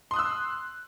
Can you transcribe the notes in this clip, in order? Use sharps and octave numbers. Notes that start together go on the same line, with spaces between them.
C6 D#6 E6 F#6